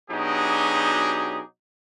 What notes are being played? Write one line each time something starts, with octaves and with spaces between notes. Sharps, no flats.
B2 F#3 D4 D#4 G4 G#4